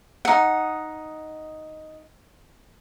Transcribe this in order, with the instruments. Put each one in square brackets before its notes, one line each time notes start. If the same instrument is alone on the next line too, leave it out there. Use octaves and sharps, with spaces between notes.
[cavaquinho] D#4 F#5